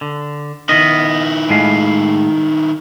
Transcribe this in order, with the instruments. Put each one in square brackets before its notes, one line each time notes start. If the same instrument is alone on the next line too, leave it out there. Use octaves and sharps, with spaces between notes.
[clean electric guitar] D3
[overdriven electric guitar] D#3 E4 [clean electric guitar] B3 D#5
[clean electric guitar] A2 G#3 F5